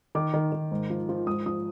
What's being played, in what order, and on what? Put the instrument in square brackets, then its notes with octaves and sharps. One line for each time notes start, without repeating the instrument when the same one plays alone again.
[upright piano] D#3 D6
D#3
D#3
G#2
F3
F3
G#2 D#6
F3 D#6